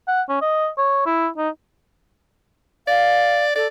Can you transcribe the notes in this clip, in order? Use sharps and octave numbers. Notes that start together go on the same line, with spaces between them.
F#5
C#4
D#5
C#5
E4
D#4
D5 F5
A4 D5